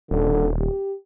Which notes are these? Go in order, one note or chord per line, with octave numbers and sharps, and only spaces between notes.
D#1 D3
G4